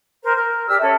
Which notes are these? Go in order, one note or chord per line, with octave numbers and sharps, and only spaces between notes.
A#4 C5
A#4
G4 D5 E6 F6
C#4 A4 C#5 E5